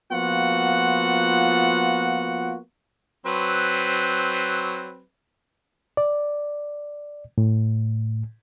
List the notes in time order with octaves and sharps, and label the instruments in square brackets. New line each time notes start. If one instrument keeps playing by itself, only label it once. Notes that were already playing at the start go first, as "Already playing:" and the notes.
[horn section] F3 A#3 B3 F4 F#4 F#5
[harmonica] F#3 C4 B4
[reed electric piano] D5
A2